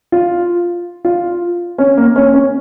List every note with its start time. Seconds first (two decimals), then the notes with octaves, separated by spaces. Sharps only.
0.12 F4
1.05 F4
1.78 C#4
1.97 A#3
2.16 C#4
2.34 C#4